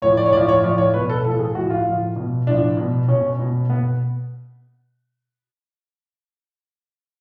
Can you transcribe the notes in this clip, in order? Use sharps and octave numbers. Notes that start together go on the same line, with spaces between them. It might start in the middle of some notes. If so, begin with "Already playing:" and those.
A2 F3 C#5
D5
C#5
A2 D5
F3
C#5
A2 F3 D5
C#5
B2 B4
A4
A2 F3 A4
G#4
A2 F3 F#4
F4
A2 F3
B2
A2 F3 D4
B2
B2 C#4
B2
B2 B3